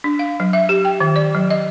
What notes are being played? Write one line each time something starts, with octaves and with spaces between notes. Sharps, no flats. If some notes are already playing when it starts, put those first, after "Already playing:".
D4
F5
F#3
E5
G4
G5
D#3
D5
F#3
D#5